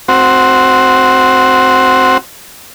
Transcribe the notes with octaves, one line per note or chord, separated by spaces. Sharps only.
C4 F#4